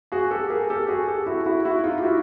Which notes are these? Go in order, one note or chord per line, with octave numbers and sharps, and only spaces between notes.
F#4 G#4
G4 A4
G#4 A#4
G4 A4
F#4 G#4
G4 A4
E4 F#4
E4 F#4
E4 F#4
D#4 F4
G4
E4 F#4